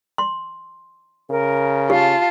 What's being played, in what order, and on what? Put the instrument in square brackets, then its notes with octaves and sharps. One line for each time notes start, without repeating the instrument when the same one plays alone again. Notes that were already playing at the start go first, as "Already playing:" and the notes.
[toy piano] C6
[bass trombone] C#3 [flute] A#4
[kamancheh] F4 A5 [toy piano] G4